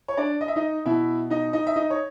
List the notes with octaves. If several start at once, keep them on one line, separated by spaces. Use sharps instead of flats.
C#5
D4 D5
D#5
E5
D#4 D#5
B2 E4 E5
D#4 D#5
D#4 D#5
E5
D#4 D#5
C#5